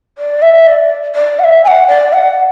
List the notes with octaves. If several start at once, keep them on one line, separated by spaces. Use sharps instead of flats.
D5
E5
D5
D5
F#5
E5
G#5
F#5
D5
F#5